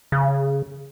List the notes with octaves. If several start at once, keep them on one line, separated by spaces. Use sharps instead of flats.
C#3